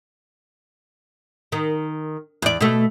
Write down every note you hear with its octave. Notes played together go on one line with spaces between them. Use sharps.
D#3
E2 D5
B2 A3